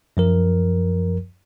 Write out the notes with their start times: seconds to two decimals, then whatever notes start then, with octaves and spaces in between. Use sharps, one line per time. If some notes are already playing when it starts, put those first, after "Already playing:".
0.17 F#2 F3 A#4